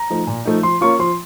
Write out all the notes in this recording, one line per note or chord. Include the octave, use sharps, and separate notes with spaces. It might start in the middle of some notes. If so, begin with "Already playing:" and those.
Already playing: A#5
F3 A3 D#4
A#2
F3 A3 D#4
F3 C6
A#3 C#4 F4 C#6
F3 C6